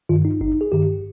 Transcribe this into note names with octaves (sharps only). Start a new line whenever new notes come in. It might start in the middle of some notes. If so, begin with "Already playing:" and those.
G2 D#3 F4
D#4
G#1 D#4
G#4
G2 D#3 G4